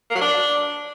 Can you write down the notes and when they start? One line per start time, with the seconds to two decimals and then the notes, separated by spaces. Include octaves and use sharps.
0.10 A#3
0.15 F#3
0.21 D4